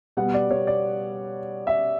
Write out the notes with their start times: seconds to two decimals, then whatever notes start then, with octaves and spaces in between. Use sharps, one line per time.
0.17 B2 G3 B3 F#5
0.34 D5
0.51 C#5
0.67 D5
1.67 E5